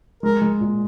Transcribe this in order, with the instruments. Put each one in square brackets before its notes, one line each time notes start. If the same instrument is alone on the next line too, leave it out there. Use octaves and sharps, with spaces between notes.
[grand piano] G#3 [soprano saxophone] A#4
[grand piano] G#3
A#2